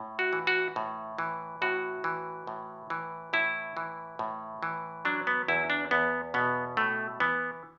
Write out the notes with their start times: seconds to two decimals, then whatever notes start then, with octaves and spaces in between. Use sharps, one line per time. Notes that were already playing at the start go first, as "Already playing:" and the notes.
Already playing: A2
0.19 F#4
0.33 E3
0.47 F#4
0.76 A2
1.18 E3
1.62 A2 F#4
2.04 E3
2.47 A2
2.90 E3
3.33 A2 E4
3.77 E3
4.19 A2
4.63 E3
5.05 F#3 D4
5.27 B3
5.48 E2 E4
5.70 D4
5.91 E2 B3
6.34 B2 B3
6.77 A2 A3
7.20 E3 B3